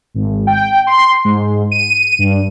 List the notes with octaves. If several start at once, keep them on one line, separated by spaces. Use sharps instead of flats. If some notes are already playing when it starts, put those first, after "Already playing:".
G#1
G5
C6
G#2
D#7
G2